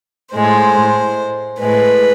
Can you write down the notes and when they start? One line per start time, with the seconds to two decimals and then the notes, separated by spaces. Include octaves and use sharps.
0.35 A2 G#3 C5
1.61 A2 G#3 B4